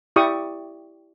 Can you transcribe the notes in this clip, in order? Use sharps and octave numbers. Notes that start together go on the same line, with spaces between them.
E4 G4 D5 C#6 D#6